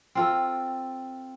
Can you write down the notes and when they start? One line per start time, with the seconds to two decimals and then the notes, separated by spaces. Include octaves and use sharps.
0.15 C4 F4 A4